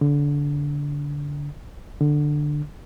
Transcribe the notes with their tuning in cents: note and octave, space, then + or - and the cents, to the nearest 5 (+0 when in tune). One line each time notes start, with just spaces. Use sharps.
D3 -25
D3 +10